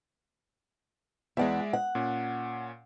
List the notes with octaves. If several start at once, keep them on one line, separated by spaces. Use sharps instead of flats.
E2 G#3 D5 E5 F#5
F#5
A#2 C#4